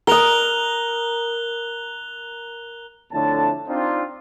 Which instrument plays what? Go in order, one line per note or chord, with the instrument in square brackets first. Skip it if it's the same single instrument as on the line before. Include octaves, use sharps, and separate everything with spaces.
[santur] A#4 D#6 [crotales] F#6 F7 G7
[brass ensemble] F2 A2 D3 A3 C#5 A5
C4 D4 D#4 F4